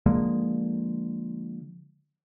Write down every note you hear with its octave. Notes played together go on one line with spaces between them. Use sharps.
D3 F3 G#3 A#3